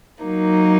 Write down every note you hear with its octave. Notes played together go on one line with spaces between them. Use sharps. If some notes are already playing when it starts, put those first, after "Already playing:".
F#3 A#3 D#4